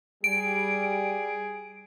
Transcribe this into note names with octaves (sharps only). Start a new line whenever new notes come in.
G3 G#4 D7